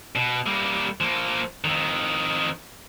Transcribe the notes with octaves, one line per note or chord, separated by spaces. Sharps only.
B2
G3 A#3
F3 A#3
F2 D#3